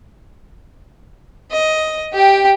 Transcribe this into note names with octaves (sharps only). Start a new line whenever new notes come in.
D#5
G4 G5